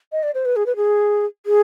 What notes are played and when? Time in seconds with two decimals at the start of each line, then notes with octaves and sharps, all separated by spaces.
0.12 D#5
0.23 D5
0.34 C5
0.45 B4
0.56 G#4
0.66 B4
0.76 G#4
1.46 G#4